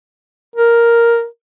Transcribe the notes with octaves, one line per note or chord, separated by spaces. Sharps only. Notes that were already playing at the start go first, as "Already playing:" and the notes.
A#4